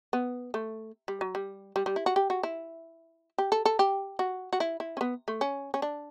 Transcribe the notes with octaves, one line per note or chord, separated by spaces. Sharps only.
B3
A3
G3
F#3
G3
G3
G3
E4
F#4
G4
F#4
E4
G4
A4
A4
G4
F#4
F#4
E4
E4
C#4
B3
A3
C#4
C#4
D4